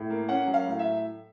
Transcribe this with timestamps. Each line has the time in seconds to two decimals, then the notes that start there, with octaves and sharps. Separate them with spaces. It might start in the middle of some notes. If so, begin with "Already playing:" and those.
Already playing: A2
0.10 A#3
0.28 C#4 F#5
0.47 F#3
0.54 F5
0.67 A2
0.79 E5